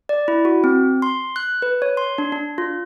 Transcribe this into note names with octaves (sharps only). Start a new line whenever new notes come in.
D5
E4
F#4
C4
C6
F#6
B4
C#5
C6
D4
D4
F4